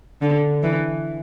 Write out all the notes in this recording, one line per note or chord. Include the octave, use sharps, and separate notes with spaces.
D3
E3